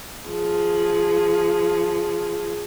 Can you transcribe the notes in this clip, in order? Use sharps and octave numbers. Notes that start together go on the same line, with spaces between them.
F3 G#4